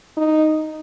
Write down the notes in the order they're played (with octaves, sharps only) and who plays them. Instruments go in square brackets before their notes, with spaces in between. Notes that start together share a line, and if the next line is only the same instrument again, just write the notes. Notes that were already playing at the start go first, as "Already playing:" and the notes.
[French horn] D#4